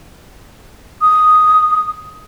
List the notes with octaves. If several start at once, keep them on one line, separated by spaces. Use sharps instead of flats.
D#6